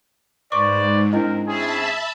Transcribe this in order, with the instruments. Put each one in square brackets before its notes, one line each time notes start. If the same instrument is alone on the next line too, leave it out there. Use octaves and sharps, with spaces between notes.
[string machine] G#2 [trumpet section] B4 C5 D5 [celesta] C#6 D6
[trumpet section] C4 A#4 [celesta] D4 E4 D#5
[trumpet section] C4 C#4 G#4 [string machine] E5 A5 B5